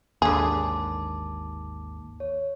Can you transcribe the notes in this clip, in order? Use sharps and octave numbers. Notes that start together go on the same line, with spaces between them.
G#1 D#2 D3 G#4 A5 D6
C#5